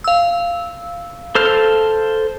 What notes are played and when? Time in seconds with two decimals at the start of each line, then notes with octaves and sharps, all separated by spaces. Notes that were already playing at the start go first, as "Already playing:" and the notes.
0.04 F5 E6
1.35 A4 C5 F6